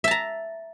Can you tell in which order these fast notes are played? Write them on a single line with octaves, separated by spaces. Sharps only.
E5 A5 A#5